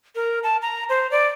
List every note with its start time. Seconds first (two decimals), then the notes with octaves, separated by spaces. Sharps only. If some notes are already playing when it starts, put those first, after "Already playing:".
0.15 A#4
0.43 A5
0.62 A#5
0.89 C5
1.11 D5